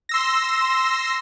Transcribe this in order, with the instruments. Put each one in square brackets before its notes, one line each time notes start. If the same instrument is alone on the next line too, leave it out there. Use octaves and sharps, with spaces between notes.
[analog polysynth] C6 E6 A#6